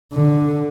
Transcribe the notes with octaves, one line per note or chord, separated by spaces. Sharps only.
D3